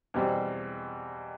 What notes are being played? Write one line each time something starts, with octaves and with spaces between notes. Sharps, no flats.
E2 B2 G3 C4